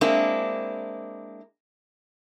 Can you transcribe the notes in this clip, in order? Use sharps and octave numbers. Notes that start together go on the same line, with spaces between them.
G#3 A#3 C4 D4 E4